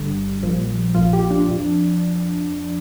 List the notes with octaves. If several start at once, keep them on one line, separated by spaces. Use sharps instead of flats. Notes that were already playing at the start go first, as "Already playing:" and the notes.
Already playing: G1 G2 D3 G3
A#1 A#2 F3
A#1 A#2 F3 F4
G4
D4
F2 F3